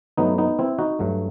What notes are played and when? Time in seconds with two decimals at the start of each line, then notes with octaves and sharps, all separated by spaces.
0.17 G2 F#3 A3 B3 D#4
0.38 B3 D#4
0.59 C4 E4
0.79 D#4 F#4
0.99 G2 F#3 A3